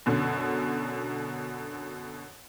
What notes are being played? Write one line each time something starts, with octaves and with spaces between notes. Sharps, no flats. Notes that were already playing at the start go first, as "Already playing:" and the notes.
F#2 B2 D3